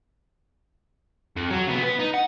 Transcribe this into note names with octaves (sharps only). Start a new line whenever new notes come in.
F2
F#3
C#3 B3
B3 B4
D#4
F#5